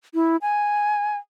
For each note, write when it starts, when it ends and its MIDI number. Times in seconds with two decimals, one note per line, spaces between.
0.14 0.37 64
0.42 1.17 80